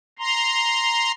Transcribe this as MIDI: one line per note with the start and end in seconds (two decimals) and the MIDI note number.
0.19 1.12 82
0.19 1.12 84